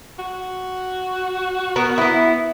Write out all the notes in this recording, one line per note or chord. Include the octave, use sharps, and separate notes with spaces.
F#4
B3 A#4
B3 E4